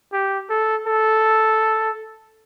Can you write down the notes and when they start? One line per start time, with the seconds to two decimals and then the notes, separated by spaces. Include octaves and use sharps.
0.13 G4
0.50 A4
0.87 A4